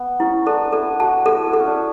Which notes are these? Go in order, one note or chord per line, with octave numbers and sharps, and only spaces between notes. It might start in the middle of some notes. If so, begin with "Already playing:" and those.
Already playing: B3
C#4 E4
D4 A4
E4 A4
F#4 A5
E4 A4
E4
A4
C#4
D4